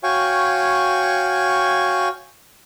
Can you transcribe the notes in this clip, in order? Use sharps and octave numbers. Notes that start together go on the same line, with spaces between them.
F#4 C#5 F5 G5 G#5 C#6